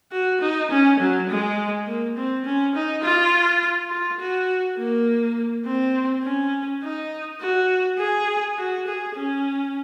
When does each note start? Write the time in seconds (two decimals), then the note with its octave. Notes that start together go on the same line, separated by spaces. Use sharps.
0.12 F#4
0.41 D#4
0.70 C#4
0.99 F#3
1.29 G#3
1.87 A#3
2.17 C4
2.45 C#4
2.75 D#4
3.03 F4
3.91 F4
4.20 F#4
4.78 A#3
5.65 C4
6.23 C#4
6.83 D#4
7.41 F#4
7.98 G#4
8.58 F#4
8.87 G#4
9.16 C#4